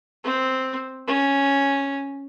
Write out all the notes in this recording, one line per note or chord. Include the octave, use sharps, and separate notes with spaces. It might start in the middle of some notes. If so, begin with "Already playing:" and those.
C4
C#4